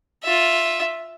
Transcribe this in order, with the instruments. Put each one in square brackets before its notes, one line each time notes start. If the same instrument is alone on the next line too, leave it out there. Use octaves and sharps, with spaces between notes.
[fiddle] F4 E5